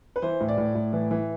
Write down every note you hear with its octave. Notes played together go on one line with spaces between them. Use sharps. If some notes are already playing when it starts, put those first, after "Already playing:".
B4
E3 C5
A2
D5
A2
A2
E3
E3